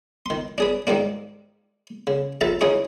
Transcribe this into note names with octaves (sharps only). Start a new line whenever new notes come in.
D#3 C6
D4 G#4 B4
G#2 D#3 G3 A#3 D4
C#3
A#1 A4 E5 A5 A#5
D2 E3 C#4 D#4 G#4 C#6